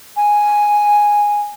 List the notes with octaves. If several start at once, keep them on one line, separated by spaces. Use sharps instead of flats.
G#5